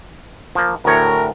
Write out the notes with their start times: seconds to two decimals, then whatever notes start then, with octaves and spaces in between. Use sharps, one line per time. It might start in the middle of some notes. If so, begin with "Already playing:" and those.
0.55 F3 A#3
0.85 D2 A2 A#4 C#5